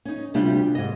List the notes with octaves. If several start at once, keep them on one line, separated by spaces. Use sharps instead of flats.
C#4 D#4
D2 C3 G3 D4 F4 G4
G#2 D#5